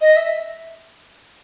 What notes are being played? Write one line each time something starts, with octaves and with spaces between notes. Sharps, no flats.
D#5
E5